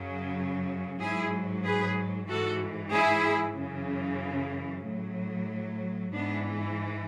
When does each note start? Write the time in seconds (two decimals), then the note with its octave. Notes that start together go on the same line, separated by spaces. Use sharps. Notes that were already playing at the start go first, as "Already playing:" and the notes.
Already playing: F#2 C#3 F#3
1.01 G#2 F#3 E4 G#4
1.65 G#4 B4
2.29 G#2 E3 F#4 A4
2.93 E4 G#4
3.58 F#2 C#3 E3
4.85 A2 F#3
6.13 G#2 E3 B3 D4